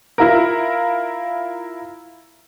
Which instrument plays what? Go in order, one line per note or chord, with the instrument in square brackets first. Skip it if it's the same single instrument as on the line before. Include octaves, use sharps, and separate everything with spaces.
[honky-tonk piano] E4 F4 A#4